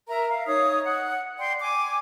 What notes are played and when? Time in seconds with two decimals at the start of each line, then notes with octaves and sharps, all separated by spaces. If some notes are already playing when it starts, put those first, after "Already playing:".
0.08 A#4 E5 A#5
0.29 F5
0.47 D#4 C#5 D#6
0.84 F#5
1.38 D5 G5 C6
1.60 G#5 D6